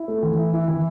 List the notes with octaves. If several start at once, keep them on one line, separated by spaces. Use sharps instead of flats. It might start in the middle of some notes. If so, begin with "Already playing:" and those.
Already playing: E4
A3
E3
E4
E4
E3